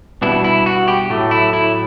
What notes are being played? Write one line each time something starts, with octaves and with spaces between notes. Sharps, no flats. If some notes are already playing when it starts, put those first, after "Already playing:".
B2 G3 B3 D4 E4
E4
F#4
G4
A2 F#3 A3
E4
E4